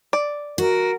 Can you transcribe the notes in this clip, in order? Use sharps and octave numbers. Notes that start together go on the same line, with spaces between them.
D5
F#4 A#4